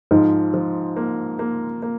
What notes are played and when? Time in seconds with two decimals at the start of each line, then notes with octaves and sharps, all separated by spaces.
0.11 G#2 F3
0.54 F3
0.97 A#3
1.39 A#3
1.83 A#3